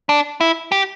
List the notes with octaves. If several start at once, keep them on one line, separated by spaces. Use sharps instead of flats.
D4
E4
G4